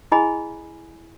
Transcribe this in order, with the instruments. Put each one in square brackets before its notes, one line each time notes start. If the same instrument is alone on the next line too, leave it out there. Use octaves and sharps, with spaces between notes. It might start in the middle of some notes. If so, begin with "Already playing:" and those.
[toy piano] E4 G#4 D#5 G#5 B5